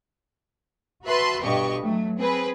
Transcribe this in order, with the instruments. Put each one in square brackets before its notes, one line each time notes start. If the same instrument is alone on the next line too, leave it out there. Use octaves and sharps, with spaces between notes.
[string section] F#4 B4 E5 A5 C6 F#6
G1 G2 B2 G4 D#5 C#6
F#3 A3
C4 G#4 B4